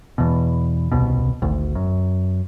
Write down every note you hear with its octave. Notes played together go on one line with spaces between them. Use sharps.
E2 B2
D#1 C2 B2
G#1 D2
F#2